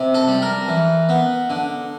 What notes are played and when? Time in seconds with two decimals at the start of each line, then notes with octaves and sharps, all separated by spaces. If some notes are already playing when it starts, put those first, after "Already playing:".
Already playing: C3
0.14 A4
0.28 G3
0.42 A#4
0.68 E3
1.09 B3
1.50 D3